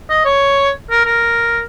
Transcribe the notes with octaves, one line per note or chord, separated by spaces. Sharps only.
D#5
C#5
A#4
A#4